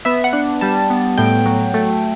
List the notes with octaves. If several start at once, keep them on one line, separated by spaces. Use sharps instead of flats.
B3 E5
F#5
D4
G3 A5
B3
A2 G5
F#3
A3